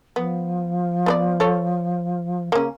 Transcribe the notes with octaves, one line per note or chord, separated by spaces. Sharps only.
F3 B3
B3 B4 D5
A4 C#5
C#3 A#3 C#4